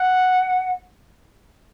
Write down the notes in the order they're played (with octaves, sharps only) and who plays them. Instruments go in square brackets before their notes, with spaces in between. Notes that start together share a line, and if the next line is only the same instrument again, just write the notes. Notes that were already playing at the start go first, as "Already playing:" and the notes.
Already playing: [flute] F#5